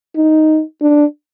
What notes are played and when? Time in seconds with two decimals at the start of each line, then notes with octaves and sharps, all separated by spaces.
0.16 D#4
0.82 D4